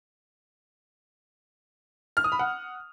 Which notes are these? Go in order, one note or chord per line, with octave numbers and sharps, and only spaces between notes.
F6
D#6
B5
F#5